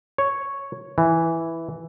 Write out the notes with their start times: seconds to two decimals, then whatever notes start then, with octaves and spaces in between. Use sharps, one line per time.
0.18 C#5
0.98 E3